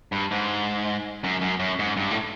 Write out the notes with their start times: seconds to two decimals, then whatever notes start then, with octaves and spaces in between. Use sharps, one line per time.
0.12 G2
0.31 G#2
1.24 F#2
1.41 F#2
1.60 F#2
1.79 G#2
1.97 G2
2.11 A2